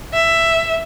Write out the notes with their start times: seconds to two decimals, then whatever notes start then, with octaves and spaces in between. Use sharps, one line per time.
0.14 E5